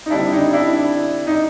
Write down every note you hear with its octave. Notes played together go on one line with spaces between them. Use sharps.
D#4
D3 G3 C4 D4 E4
D#4
D4 E4
D#4